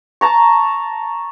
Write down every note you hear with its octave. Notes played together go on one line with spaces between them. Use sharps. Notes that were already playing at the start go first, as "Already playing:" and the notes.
A5 A#5 C#6